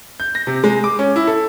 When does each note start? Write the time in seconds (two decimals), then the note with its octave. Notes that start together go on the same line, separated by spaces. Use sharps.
0.20 G6
0.35 A#6
0.47 C3
0.64 G#3
0.84 D6
0.99 C#4
1.16 E4
1.27 A4